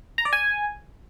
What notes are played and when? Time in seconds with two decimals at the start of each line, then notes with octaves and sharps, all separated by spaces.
0.18 A#5
0.25 D5
0.33 G#5